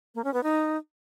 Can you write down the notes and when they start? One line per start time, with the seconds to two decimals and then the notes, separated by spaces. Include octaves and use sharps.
0.15 A#3
0.24 C#4
0.34 B3
0.43 D#4